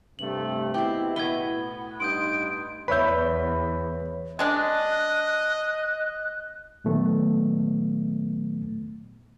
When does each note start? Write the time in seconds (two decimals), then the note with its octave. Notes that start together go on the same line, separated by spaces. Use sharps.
0.19 G2 C3 A3 F#7
0.74 B2 C4 E4 G4
1.16 A2 B3 G#6 G7
2.00 G2 D#4 C6 D#6 G6 D7
2.88 E2 B4 C#5 E5 B5 G6
4.39 G#3 D4 D#5 F#6
6.84 A#2 D#3 F#3 A3 B3